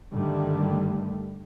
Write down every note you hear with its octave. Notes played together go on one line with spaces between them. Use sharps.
G2 D3 D#3 G3 A3